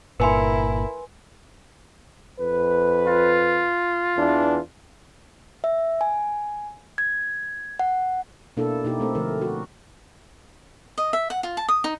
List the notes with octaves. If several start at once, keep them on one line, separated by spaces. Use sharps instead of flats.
G1 A#2 E4 A#4 B4 G#5 C6
F2 B4
F4
E2 E3 D4
E5
G#5
G#6
F#5
B2 A#3 D4 E4 A4
B2 A#3 D#4 E4 G4
A3 C4 A4
D3 F3 A3 A#4
F#4
D#5
E5
F#5
F4
A5
D#6
D#4